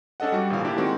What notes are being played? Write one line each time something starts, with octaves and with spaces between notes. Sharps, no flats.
C#4 D4 A4 D#5 F#5
G3 D4 F#4
G#1 A#2 D3 E3 F5
A#3 D4 E4 G4
D#3 G#3 C4 F#4